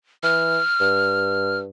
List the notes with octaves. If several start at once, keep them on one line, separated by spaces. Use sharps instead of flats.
E3 F6
G2